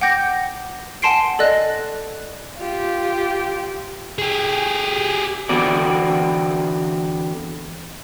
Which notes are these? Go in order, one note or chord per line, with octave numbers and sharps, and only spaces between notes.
F#5 G5 D6 G6 A#6
F#5 G#5 A5 C6 C7 D7
A4 D5 D#5 F#6
F4 G4
G4 G#4
D3 E3 B3 C4 F#4 D5